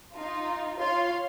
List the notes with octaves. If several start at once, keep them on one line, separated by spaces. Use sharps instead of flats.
D#4 F4
F4 C#5 F5 C6